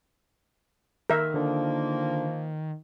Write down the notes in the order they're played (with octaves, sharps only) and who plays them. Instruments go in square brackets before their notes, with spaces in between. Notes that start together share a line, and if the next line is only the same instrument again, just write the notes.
[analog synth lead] D#3 [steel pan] A#4 E5
[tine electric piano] D3 D4 [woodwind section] F3 A#3